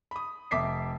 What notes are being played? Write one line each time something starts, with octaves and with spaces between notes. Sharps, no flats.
B5 D#6
F1 E5 D6 B6 C7